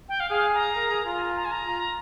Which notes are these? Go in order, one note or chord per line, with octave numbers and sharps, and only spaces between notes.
G5
F5
G#4 F5
A#5
A#4
G#4
F4
G#5
A#5
A#5
G#5
A#5
F4